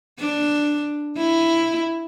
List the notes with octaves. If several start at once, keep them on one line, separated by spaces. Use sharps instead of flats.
D4
E4